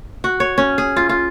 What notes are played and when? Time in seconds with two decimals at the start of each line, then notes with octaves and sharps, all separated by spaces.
0.24 F#4
0.40 C#5
0.58 C#4
0.78 G#4
0.96 F4
1.09 F4